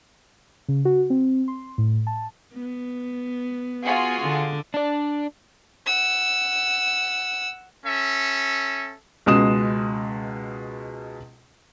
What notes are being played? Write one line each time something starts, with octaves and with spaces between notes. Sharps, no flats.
C#3
F#4
C4
C6
A2
A5
B3
F4 F#4 G#4
D3
D4 D5
F#5 E6
C#4 A4 E5
C#2 B2 G#3 D#6 E7